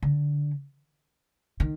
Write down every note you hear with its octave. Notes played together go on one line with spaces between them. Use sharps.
D3
D#3